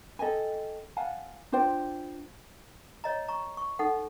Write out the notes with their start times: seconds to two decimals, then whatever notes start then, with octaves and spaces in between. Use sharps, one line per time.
0.19 A4 D#5 G5 G#5
0.97 F5 F#5 G#5 A5
1.52 D4 F4 C5 G5
3.04 C#5 D#5 A#5
3.28 A#5 C#6
3.57 C#6
3.79 D#4 A4 F#5